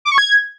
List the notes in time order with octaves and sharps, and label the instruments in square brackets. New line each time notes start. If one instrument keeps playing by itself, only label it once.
[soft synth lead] D6
C#6
G#6